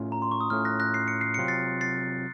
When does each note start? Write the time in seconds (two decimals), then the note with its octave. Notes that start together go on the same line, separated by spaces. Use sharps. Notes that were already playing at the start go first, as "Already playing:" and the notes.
Already playing: A2 A3 C#4 F4
0.12 A#5
0.22 C6
0.31 C#6
0.40 D#6
0.50 A2 A3 C#4 F4 F6
0.65 F#6 A#6
0.80 F#6 A#6
0.94 C7
1.08 C#7
1.21 C7
1.34 C3 F#3 C4 F4 C#7
1.48 A6 C7
1.81 A6 C7